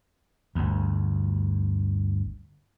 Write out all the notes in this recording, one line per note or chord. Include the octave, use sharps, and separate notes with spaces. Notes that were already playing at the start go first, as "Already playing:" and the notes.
G1 D2